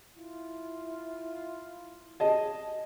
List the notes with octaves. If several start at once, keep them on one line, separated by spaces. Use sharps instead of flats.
E4 F4
G#4 D#5 A5